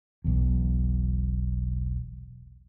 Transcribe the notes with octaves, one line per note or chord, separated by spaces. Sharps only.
E1 B1 E2